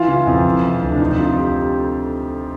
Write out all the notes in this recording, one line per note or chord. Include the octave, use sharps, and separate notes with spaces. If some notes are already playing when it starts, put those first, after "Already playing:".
Already playing: E3 F4
C#3
F2
E3
C3
D2
D4
F2 D#4
D3 F4
G4